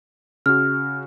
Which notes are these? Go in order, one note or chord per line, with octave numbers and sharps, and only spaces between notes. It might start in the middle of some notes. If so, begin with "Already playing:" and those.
C#3 F#4 F6